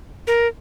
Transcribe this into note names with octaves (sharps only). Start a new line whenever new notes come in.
A#4